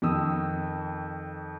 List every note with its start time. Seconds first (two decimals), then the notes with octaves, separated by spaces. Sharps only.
0.02 F2 D#3 D#6 E6